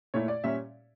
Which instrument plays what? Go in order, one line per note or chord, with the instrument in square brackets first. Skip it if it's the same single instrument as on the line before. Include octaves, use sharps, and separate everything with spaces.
[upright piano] A#2 A3 E4 C#5
D5
A#2 G3 C#4 E5